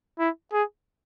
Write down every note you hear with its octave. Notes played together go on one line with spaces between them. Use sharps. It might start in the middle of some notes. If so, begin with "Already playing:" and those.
E4
G#4